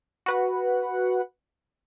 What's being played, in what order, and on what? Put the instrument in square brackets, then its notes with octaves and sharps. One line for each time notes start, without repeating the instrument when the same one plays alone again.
[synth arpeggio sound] F#4 B4 F#5